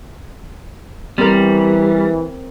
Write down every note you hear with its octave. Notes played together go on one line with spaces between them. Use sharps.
E3 G3 C4 A#4